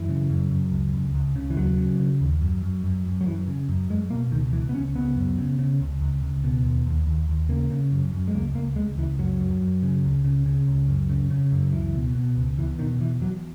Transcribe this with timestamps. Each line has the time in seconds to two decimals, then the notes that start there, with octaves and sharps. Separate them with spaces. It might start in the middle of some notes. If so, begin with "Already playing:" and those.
Already playing: F#2 E3
0.09 C#3
0.30 F#2
0.51 F#2
0.72 C#2
0.93 C#2
1.14 C#2
1.36 C#3
1.50 E3
1.56 D#2 F#3
1.78 C#3
2.00 C#3
2.21 D#2
2.41 F#2
2.63 F#2
2.84 F#2
3.06 F#2
3.21 F#3
3.26 F#2 E3
3.47 C#3
3.69 F#2
3.90 F#2 G#3
4.10 B2 A#3
4.32 C#2 D#3
4.53 C#2 E3
4.69 B3
4.74 C#2 C#4
4.95 C#3 B3
5.16 F#2
5.38 C#3
5.59 C#3
5.80 C#2
6.01 C#2
6.23 C#2
6.44 B2
6.64 D#2
6.86 D#2
7.07 D#2
7.29 D#2
7.49 C#3 A#3
7.70 C#3
7.92 F#2
8.13 F#2
8.28 G#3
8.34 C#2 A#3
8.55 C#2 A#3
8.76 C#2 G#3
8.98 C#2 E3
9.18 F#2 F#3
9.41 F#2
9.61 F#2
9.82 C#3
10.04 C#2
10.24 C#3
10.46 C#3
10.68 C#2
10.88 F#2
11.10 C#3
11.30 C#3
11.52 F#2
11.73 C#2 E3
11.94 B2
12.15 B2
12.37 C#2
12.58 E2 E3
12.79 B2 D#3
13.00 E2 E3
13.21 E2 F#3